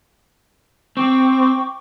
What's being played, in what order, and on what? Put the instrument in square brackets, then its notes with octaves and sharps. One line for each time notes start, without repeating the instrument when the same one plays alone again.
[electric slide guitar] C4 [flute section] G5 C#6 D6